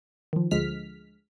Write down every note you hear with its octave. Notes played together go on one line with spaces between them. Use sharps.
D#3 F3
D2 D3 F3 G#3 F6 B6